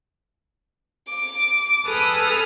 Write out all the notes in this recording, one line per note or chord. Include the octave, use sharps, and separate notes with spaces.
D6
G#4 A4 B4 D#6 F6